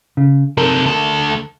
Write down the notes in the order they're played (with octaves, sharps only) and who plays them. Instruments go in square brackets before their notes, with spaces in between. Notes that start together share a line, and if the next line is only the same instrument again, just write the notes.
[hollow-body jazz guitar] C#3
[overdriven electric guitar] C3 A4 [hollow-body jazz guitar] A#4
[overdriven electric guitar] D2 A4